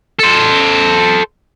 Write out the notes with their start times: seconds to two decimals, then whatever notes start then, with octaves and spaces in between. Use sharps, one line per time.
0.20 A4 C5